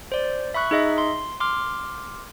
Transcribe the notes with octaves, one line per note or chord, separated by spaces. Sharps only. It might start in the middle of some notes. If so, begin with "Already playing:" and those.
C5 D5
E5 B5 C#6 F#6
D#4 G#4 D#5 E5
C6
C6 D6 F6